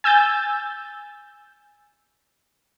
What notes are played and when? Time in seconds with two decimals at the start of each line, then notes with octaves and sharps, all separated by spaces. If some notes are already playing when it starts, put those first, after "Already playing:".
0.04 G#5 E6 G6 A6